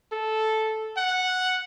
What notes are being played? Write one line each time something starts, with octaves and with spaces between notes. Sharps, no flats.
A4
F#5